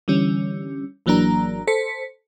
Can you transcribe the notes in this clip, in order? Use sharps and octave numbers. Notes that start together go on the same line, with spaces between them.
D3 E3 G3 C#4
G#1 E3 F#3 A#3 D4 A#5
A4 C5 B6 C#7